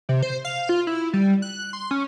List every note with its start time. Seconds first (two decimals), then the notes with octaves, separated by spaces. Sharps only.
0.09 C3
0.22 C5
0.45 F5
0.69 F4
0.87 E4
1.13 G3
1.42 F#6
1.73 C6
1.91 C#4